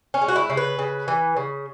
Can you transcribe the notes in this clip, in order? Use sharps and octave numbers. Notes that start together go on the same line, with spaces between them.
C#4
G#3
F#4
E4
C#3
B4
C#3
E3
C#3